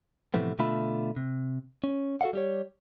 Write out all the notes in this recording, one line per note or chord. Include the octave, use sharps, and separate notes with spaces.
A2 C3 E3 F3 A3 B3
B2 D3 A3 F4 E5 B5
C3
C#4
F#4 A4 D#5 F5 F#5
G3 G4 C#5